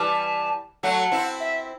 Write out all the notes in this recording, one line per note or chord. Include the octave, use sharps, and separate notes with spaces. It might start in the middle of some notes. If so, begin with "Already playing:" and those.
Already playing: E3 G3 A5
F#3 A3 F#5
C4 E4
E5